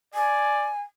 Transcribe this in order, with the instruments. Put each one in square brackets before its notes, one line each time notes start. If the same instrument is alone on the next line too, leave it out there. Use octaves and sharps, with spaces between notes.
[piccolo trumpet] D5 [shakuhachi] G#5